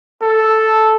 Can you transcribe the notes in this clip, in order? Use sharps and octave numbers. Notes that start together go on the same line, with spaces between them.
A4